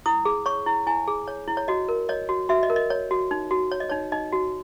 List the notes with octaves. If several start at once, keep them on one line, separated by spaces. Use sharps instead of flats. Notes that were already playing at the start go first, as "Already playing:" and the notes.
E4 D#6
G#4
C#5 C#6
E4
E4 G#5
G#4
C#5
E4
C#5
F#4 D#5
A#4
C#5 D#5
F#4
F#4 E5
D#5
A#4
D#5
C#5
F#4
D#4
F#4
C#5
D#5
D#4 C#5
D#4 D#5
F#4